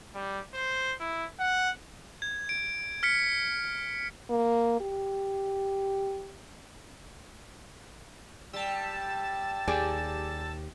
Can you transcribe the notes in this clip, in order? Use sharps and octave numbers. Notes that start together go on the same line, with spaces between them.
G3
C5
E4
F#5
G#6
D7
F6 B6 C#7
A#3
G4
G3 A5 E6
D#2 G4 G#4 D5